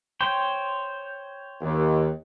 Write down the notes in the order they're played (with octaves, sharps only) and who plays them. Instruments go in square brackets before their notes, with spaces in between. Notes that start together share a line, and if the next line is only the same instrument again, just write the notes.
[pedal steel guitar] C5 C#5 G5
[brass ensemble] D#2